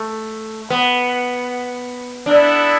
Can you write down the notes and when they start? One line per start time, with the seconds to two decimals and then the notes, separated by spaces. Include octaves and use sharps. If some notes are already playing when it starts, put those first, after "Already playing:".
Already playing: A3
0.70 B3
2.25 B3 D4 E4 A4